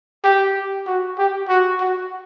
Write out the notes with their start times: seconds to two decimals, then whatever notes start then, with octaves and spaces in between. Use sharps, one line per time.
0.24 G4
0.87 F#4
1.18 G4
1.48 F#4
1.80 F#4